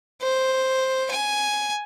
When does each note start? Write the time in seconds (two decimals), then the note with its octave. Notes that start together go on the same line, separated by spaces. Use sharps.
0.22 C5
1.10 G#5